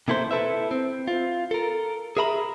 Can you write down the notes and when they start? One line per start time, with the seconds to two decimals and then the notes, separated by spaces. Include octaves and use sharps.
0.08 C3 A#3 E4 A4 C5
0.31 E4 A4 B4 E5
0.71 C4
1.08 F4
1.51 A4 A#4
2.17 G#4 A#4 E5 A#5 B5